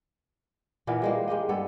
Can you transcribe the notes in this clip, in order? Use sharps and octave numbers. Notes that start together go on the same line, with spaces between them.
A#2 E3 B3 A#4
G3 G#3 A#3
G#3 A#3 G4 D#5
G2 B3 G#4 A4